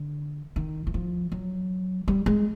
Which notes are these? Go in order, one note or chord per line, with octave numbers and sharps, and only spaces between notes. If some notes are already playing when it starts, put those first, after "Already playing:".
Already playing: D3
D#3
E3
F3
F#3
G3
G#3